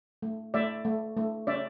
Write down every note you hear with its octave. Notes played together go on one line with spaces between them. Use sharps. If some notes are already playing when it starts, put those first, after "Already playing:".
A3
A3 D5 E5
A3
A3
C#4 D5 E5